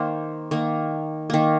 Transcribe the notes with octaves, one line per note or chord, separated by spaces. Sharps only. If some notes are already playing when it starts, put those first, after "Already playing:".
Already playing: D#3 A#3 C5
D#3 A#3
D#3 A#3